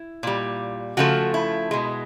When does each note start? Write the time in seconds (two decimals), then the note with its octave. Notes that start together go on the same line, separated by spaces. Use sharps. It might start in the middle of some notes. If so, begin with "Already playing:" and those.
Already playing: E4
0.23 A#2 G3
0.97 C#3 F3 A3 F#4
1.34 E4
1.71 B2 G#3